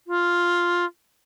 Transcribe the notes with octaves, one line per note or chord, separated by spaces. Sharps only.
F4